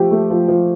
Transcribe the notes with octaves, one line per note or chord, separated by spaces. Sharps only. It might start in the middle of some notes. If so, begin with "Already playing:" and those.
Already playing: F3 A3 G4
A3
F3
F3